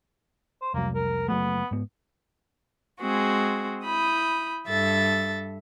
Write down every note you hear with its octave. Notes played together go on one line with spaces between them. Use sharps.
C5
F1 C2 F#3 A#3
A#4
F#1 F#3 A3 B3
G#2 B3
G#3 C4 F#4 G#4
E4 B5 D#6 G6
G2 A4 E5 A6